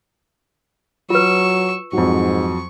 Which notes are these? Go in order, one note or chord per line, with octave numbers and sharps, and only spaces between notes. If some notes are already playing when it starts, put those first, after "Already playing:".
F#3 F4 B4 C#6 E6
F2 G#2 F#3 C#6